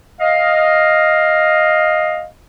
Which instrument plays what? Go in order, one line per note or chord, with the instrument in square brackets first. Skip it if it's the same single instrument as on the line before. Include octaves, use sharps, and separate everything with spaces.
[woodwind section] D#5 F5